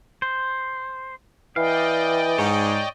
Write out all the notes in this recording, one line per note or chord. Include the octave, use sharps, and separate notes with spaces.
C5
E3 D5 D#5 F5 G5
G#2 C#5